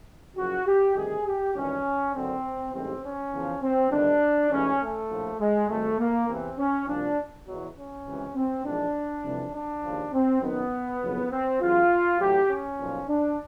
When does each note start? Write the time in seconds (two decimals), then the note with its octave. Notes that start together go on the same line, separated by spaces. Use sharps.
0.36 F#1 F#2 C#3 F3 F#4
0.66 G4
0.95 D2 C3 D#3 G3 G#4
1.26 G4
1.55 G#1 G2 E3 G3 C#4
2.13 F#1 F#2 D3 F#3 C4
2.73 A1 G#2 E3 G3 C4
3.03 C#4
3.32 E2 C#3 F3
3.62 C4
3.91 G1 G2 D#3 G3 D4
4.50 A1 G#2 E3 C#4
4.80 A3
5.10 A#1 A2 F3
5.39 G#3
5.68 G#1 G#2 D#3 G3 A3
5.99 A#3
6.28 E2 C3 E3 C4
6.58 C#4
6.87 C2 A#2 F3 D4
7.46 E2 B2 F#3
7.76 C#4
8.05 C#2 C3 E3
8.35 C4
8.64 A#1 G#2 E3 D4
9.23 F2 C3 E3 G3
9.53 D4
9.83 D#2 C#3 F3
10.13 C4
10.41 F#2 D#3 F#3 B3
11.01 F#1 F2 C#3 F#3
11.30 C4
11.61 E2 C#3 F#3 F4
12.19 A1 A2 F#3 G4
12.49 C#4
12.78 B1 A#2 F3
13.08 D4